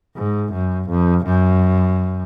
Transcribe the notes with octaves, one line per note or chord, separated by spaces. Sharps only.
G#2
F#2
F2
F#2